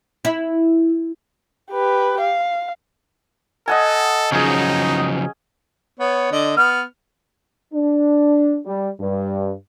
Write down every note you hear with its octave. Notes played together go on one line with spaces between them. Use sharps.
E4
G4 B4
F5
A4 D#5 F#5 G#5
C#3 F3 F#3 C#4 D#4 G#4
B3 C#5
D3 D5 D#5
B3 F6
D4
G3
G2